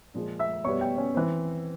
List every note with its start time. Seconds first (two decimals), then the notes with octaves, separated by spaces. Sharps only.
0.14 A#2 F3 G#3
0.39 E5 E6
0.64 B2 G3 B3 C#5 C#6
0.81 G4 G5
0.98 C#4 C#5
1.15 E3 C4 C5